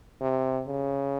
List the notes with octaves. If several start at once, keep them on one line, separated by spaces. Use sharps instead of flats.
C3
C#3